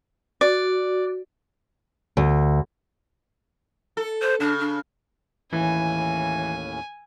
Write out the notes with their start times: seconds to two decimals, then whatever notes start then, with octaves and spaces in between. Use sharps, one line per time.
0.41 F#4 D5
2.17 D2
3.97 A4
4.22 C5
4.40 C#3 D4
4.60 D4
5.53 D#2 A2 E3 C#4 G#5